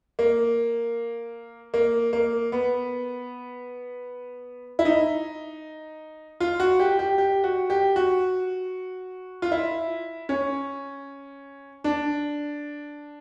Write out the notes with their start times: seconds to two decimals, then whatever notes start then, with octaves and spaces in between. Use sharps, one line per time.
0.19 A#3
1.74 A#3
2.13 A#3
2.52 B3
4.79 E4
4.85 D#4
6.40 F4
6.60 F#4
6.80 G4
6.99 G4
7.18 G4
7.44 F#4
7.70 G4
7.96 F#4
9.42 F4
9.52 E4
10.29 C#4
11.84 D4